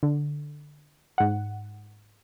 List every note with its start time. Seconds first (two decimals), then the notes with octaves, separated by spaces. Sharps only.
0.03 D3
1.18 G#2 F#5